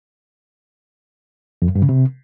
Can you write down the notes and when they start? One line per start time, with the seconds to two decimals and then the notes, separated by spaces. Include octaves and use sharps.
1.62 F2
1.69 F#2
1.75 G2
1.82 C#3
1.89 C3